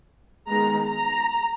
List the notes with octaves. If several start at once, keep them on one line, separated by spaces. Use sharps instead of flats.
D#3 G#3 B3 A#5
A#5